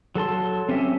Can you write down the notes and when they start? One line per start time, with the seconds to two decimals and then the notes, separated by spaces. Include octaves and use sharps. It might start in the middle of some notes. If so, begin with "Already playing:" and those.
0.15 F#3 A4 A5 C6
0.69 C4 C#4 G4 E5